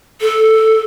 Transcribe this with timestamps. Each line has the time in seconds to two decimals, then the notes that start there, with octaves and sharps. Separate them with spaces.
0.21 A4